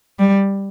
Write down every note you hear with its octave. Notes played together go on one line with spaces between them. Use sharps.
G3